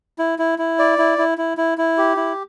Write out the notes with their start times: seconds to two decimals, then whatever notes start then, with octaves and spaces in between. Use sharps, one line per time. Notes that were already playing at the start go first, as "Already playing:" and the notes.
0.19 E4
0.39 E4
0.59 E4
0.79 D5
0.98 E4
1.18 E4
1.38 E4
1.58 E4
1.78 E4
1.98 G4
2.17 E4